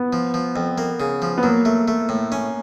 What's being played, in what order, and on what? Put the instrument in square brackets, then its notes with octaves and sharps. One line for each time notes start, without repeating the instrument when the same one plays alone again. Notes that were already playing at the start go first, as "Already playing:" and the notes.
Already playing: [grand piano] B3
[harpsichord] F3
F3
F2
A#3
C#3
F3
[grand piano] B3
[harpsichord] F#3 [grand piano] A#3
[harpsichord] A3
A3
A2
C#4